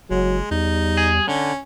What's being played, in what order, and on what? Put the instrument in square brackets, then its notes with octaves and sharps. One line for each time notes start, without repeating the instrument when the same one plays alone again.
[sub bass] F#1 [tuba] F#3 [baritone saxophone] G#3
[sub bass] E2 [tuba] G3 [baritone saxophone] D#4
[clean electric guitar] G#4
[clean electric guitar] D3 [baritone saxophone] C#4